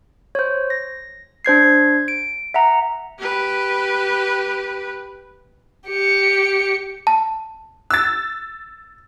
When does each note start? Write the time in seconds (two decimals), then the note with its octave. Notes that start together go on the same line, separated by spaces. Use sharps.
0.35 C5 C#5
0.70 A#6
1.45 D4 C5 G#6 C7
2.08 D7
2.54 E5 F#5 A#5
3.18 G4 B4
5.88 G4 C#7
7.07 A5
7.90 E6 F#6 A6